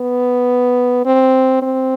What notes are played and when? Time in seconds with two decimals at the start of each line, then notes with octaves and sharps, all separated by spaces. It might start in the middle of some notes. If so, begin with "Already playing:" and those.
Already playing: B3
1.05 C4
1.62 C4